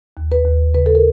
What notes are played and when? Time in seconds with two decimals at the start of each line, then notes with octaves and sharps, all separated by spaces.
0.17 D#2
0.32 B4
0.45 D#2
0.75 C#3 B4
0.86 A4
0.95 A#4